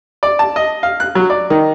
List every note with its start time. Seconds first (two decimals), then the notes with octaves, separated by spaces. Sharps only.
0.23 D5
0.39 A5
0.56 D#5
0.83 F5
1.00 F#6
1.15 F#3
1.30 D5
1.50 D#3